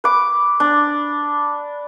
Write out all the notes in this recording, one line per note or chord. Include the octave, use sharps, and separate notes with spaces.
B4 D6
D4